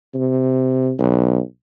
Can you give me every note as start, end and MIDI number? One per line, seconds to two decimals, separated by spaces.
0.15 0.93 48
0.99 1.40 35